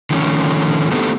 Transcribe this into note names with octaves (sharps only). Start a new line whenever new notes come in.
D3 D#3 F3 A3 B3 C#4
A3 B3 C4 D#4 G4 A4